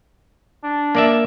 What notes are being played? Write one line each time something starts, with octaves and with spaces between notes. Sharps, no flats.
D4
A#3 D5 E5